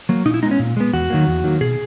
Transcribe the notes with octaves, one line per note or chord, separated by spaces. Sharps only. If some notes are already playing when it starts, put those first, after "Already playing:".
F#3 A#3
A#2 D#4
E4
G#3 B3 D#4
C#4
A#2
G#3 B3
E2 F#4
D#3 F#3 A#3
E2
D#3 F#3 A#3
B2 G#4